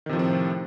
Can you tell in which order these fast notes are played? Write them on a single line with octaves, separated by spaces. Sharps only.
D#3 C3 F3 A2 C4